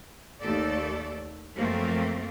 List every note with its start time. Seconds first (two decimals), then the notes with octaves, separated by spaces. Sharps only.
0.41 D#2 A3 A4 D5
1.54 F#2 F3 A3 A#3 C4